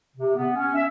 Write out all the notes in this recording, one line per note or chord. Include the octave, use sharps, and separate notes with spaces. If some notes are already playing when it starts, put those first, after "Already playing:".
C3
B3
C#4
E5